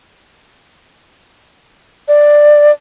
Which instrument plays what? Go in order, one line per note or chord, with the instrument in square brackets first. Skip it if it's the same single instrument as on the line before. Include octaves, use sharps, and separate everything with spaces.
[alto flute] D5